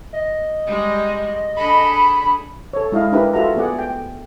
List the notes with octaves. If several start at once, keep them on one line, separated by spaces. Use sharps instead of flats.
D#5
G3 G#3
D4 G#4 A4 B5
A4 C#5
G#3 E4 D#5 F5
D4 E4 G4 A#4 B4
F4 F#4 A4 E5 F#5 A#5
A3 B3 G#4 D5 F#5
G5